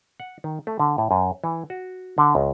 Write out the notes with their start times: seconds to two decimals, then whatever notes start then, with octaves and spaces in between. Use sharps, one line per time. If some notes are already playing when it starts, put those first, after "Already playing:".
0.20 F#5
0.44 D#3
0.67 A3
0.79 D3
0.98 A2
1.11 F#2
1.44 E3
1.70 F#4
2.18 D3
2.35 C#2